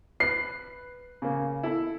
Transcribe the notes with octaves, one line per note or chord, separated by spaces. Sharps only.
B4 C7
C#3 A#3
E4 A4